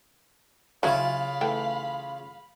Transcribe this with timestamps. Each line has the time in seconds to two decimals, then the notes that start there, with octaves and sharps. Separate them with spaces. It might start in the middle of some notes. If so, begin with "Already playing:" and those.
0.83 C#3 F#3 C#4 E4 F4 F5 B5
1.41 E3 A3 G5